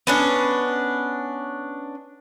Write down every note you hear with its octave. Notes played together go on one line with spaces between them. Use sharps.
B3 C#4 D4